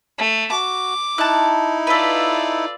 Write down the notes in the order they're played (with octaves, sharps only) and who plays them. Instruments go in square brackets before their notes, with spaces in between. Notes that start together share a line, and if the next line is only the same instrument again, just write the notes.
[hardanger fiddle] A3
[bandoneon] F#4 [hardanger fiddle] D6
[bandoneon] D#4 E4 [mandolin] A5 F#6
[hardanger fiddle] F4 D5 [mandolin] A4 B4